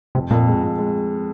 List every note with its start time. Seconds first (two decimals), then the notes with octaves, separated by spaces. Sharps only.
0.15 F2 C3
0.31 F2 A#2
0.48 G#3
0.63 F2
0.79 G#3